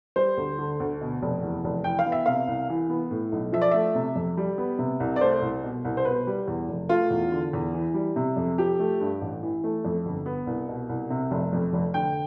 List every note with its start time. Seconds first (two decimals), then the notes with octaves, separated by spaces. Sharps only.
0.16 G3 C5
0.37 D2
0.58 D3
0.80 D2
1.01 B2
1.22 F1
1.43 E2
1.64 F1
1.84 E3 G5
1.99 F5
2.06 B3
2.12 E5
2.26 C3 F5
2.48 C2
2.70 E3
2.90 B3
3.11 A2
3.32 B1
3.52 F3 E5
3.62 D5
3.71 A3 E5
3.95 C3
4.16 F2
4.37 G3
4.58 B3
4.79 C3
5.00 C2
5.16 D5
5.21 A3 C5
5.42 C2
5.64 B2
5.85 C2
5.97 C5
6.05 B2 B4
6.27 G3
6.48 E2
6.69 F1
6.89 A3 F4
7.10 E2
7.32 D3
7.53 E2
7.74 E3
7.94 G3
8.16 C3
8.37 F2
8.58 F3 G4
8.79 A3
9.00 G2
9.22 A1
9.43 E3
9.64 A3
9.85 F2
10.06 G1
10.26 B3
10.47 C2
10.69 B2
10.89 C2
11.10 C3
11.31 F1
11.53 F2
11.73 F1
11.94 D3 G5